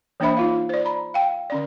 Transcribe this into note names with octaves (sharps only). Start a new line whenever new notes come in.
E3 A#3 D4 C5 E5 B5
D#4 F4 F5
C5 D5
A#5 B5
F5 G5
D3 C#4 D5